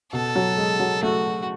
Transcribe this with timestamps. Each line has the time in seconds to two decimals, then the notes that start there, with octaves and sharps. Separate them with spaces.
0.12 B2 A4
0.36 F#3
0.57 G#3
0.80 F#3
1.03 A3 F#4